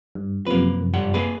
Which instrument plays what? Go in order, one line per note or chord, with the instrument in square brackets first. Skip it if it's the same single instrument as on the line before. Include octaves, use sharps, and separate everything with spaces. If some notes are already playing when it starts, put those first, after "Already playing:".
[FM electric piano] G2
[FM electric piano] F#2 C3 F3 [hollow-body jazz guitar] A#3 B4
[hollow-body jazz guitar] G2 G3 F#5
A#3 G#4 B4